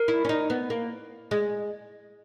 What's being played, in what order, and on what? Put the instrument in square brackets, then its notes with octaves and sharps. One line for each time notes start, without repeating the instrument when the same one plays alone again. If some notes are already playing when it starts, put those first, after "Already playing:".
Already playing: [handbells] A#4
[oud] E4
C#4
D#4
B3
A#3
G#3